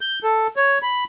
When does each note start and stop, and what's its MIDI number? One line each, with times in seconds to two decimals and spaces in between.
0.01 0.19 91
0.24 0.47 69
0.56 0.78 73
0.82 1.04 83